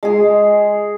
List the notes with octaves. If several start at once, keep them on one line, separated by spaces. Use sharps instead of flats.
G#3 G#4